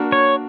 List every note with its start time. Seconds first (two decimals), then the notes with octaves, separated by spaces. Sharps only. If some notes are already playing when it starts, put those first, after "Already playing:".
Already playing: A#3 D4 F#4 A#4
0.12 C#5